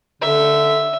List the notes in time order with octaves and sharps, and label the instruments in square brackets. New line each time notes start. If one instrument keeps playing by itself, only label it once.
[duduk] D3 [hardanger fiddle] E5